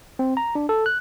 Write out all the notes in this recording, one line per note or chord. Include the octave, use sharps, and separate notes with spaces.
C4
A#5
D4
A4
F#6